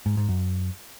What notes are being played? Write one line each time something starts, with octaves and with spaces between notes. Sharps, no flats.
G#2
G#2
F#2